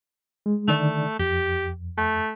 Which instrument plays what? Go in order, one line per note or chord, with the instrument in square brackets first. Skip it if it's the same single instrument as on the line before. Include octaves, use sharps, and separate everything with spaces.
[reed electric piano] G#3
[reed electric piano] D3 D#3 D5 [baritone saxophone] A3
[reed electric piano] F2 [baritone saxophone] G4
[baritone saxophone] A3